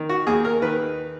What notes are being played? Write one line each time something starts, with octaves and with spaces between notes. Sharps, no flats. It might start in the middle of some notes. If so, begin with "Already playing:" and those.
Already playing: D#3
F#4
D#2 G#4
A#4
D#3 B4